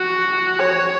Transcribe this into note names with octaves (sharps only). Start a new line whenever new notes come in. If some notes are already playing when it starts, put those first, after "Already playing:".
Already playing: F#4
C#5